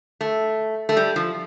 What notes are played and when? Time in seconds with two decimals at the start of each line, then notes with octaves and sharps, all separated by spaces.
0.21 A3
0.89 A3
0.97 G3
1.16 F3